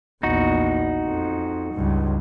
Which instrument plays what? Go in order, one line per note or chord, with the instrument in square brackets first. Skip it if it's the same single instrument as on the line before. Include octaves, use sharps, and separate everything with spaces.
[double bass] A#1 E2 [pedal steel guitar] D#4 F#4
[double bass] F2
C#2 G2